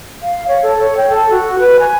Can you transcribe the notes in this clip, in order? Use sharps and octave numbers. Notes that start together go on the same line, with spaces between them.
F5
C#5
A4
C#5
G5
A4
F#4
B4
G#5